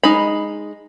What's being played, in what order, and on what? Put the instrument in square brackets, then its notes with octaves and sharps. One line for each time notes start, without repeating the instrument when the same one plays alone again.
[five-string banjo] G#3 D#4 B5